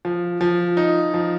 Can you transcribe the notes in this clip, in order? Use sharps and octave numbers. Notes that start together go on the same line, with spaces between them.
F3
F3
D#4
F3